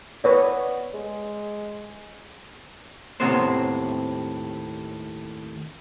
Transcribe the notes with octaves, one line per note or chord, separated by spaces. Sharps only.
B3 B4 C#5 D5
G#3
D#2 A2 C3 B3 C4 C5